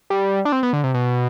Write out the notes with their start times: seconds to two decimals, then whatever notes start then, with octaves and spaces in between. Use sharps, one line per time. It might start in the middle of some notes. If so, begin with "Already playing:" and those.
0.10 G3
0.45 D4
0.52 C4
0.63 B3
0.73 D3
0.84 C3
0.94 B2